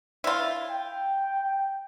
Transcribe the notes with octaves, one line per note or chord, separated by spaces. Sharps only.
E4 F4
G5